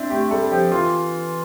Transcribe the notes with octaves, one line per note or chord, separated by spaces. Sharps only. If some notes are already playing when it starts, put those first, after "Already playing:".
Already playing: C4 D4 E4
A3 G4
G3 A4
F3 G4
E3 F4